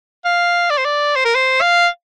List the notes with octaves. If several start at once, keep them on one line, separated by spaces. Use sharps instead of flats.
F5
D5
C5
D5
C5
A#4
C5
F5